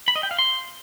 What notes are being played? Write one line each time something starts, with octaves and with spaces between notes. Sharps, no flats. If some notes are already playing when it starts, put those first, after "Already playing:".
B5
D#5
G5
F5
C6